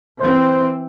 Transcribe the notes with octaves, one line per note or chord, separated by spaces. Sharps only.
E3 C4 C5